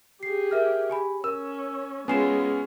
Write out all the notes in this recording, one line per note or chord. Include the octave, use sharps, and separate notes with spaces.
G4 G#4 C7
A#4 E5 F6
G4 G#5 B5
C#4 A#4 E6
G#3 B3 C#4 F4 G#5 C7 E7